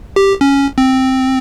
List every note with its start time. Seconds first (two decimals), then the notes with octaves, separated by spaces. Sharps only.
0.16 G4
0.41 C#4
0.78 C4